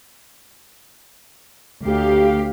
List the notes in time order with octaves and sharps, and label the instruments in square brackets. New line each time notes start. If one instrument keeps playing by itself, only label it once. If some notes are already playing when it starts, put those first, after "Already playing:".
[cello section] D2 G4 F5